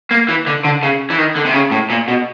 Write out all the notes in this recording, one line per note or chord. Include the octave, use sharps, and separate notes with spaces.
A#3
E3
D3
D3
C#3
E3
D#3
D3
C3
C#3
A2
A#2
B2